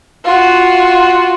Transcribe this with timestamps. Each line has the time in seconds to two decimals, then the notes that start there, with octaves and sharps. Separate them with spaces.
0.24 F4 F#4